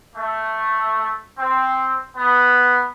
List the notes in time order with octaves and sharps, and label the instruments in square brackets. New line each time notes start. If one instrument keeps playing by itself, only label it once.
[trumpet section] A3
C4
B3